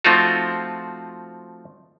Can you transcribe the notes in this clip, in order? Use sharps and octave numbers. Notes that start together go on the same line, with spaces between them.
F3 A3 C4 D#4 F4 F#4